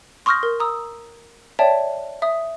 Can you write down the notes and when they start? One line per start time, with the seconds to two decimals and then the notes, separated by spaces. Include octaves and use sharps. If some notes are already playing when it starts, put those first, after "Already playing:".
0.26 C6 C#6 D#6 F6 G6 A#6
0.43 A#4
0.60 A#5 D#6 E6
1.59 C#5 D5 E5 G5 A5
2.22 E5 D#6